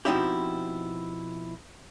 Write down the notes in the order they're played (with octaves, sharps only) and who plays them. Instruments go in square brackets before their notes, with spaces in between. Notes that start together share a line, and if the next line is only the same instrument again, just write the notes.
[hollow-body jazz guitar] B2 F3 C4 D#4 E4 G4